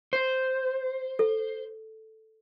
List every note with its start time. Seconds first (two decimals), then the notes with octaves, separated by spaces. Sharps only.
0.13 C5
1.19 A4